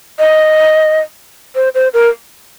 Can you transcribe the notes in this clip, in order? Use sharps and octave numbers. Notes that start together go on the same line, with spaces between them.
D#5
C5
C5
A#4